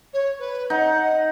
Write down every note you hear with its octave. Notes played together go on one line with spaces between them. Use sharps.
C#5
B4
D#4 F#5